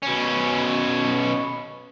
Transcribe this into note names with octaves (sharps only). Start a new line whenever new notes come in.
B2 C#4